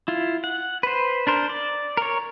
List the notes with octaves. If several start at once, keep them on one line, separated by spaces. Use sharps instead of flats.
E4 F4
F#5
B4 C5
D4 A#4 C5
D5
A#4 C#5